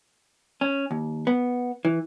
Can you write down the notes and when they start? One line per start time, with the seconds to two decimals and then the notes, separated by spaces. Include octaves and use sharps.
0.61 C#4
0.91 D#2
1.27 B3
1.85 E3